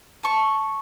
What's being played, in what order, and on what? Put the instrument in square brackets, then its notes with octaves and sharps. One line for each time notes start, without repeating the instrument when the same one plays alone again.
[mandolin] A5 C#6